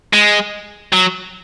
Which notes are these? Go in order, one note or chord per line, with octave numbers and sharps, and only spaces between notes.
G#3
F#3